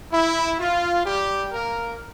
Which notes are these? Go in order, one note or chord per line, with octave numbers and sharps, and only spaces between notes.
E4
F4
G3 G4
A#3 A#4